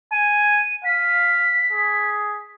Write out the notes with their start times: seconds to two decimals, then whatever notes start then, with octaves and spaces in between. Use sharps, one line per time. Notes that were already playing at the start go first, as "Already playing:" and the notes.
0.12 G#5 D#7
0.85 F5 B6
1.73 G#4